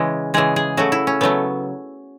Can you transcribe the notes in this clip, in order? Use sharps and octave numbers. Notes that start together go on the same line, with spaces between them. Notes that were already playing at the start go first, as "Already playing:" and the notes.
Already playing: C#3 E3 G#3
C#3 E3 G#3 G#4
G#4
C#3 F#3 A3 F#4
E4
C#4
C#3 F#3 A3 B3